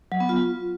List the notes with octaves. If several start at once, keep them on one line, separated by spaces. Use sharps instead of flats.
F#3
B3
F4